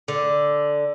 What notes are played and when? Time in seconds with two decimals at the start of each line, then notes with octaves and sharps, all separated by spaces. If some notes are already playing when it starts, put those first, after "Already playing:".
0.08 D3